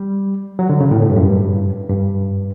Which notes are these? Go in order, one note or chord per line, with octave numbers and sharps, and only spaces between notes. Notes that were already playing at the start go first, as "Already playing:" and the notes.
Already playing: G3
F#3
D3
C#3
A2
A2
G2
F#2
G2
G2